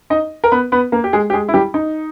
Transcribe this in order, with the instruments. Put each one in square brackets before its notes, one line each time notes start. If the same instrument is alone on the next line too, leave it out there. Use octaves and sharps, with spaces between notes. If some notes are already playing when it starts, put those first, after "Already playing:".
[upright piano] D#4 D#5
A#4
B3 B4
B3 B4
A#3 A#4
G4
G#3 G#4
G4
G#3 G#4
E4
G3 G4
D#4